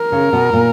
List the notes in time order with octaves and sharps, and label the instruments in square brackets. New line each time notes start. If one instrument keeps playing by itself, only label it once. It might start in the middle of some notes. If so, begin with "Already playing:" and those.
Already playing: [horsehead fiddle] A#4
[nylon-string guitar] C#3
B2
A#2